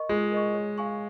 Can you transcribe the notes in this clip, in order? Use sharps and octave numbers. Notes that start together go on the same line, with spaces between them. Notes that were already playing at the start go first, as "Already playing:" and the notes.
Already playing: A#4 D#5 C#6
G#3 F4
A#4 D#5 C#6
C#5
F5 G#5 C#6